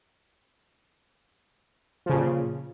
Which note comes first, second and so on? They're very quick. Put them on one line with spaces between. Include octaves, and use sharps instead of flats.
F3 C#3 A#2